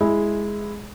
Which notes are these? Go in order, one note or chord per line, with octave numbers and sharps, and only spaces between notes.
G#3 E4